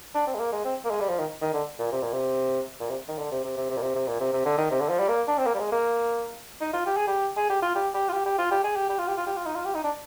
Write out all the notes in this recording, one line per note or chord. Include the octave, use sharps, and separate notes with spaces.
D4
C4
G#3
A#3
G#3
C4
A#3
G#3
G3
F3
D#3
D#3
D3
A#2
C3
A#2
C3
A#2
C3
D#3
D3
C3
C3
C3
C3
A#2
C3
C3
A#2
C3
C3
D3
D#3
C3
D3
F3
G3
A#3
D4
C4
A#3
G3
G#3
A#3
D#4
F4
G4
G#4
G4
G#4
G4
F4
G4
G4
F4
G4
G4
F4
G4
G#4
G4
G4
F4
G4
F4
G4
F4
D#4
F4
G4
D#4
D4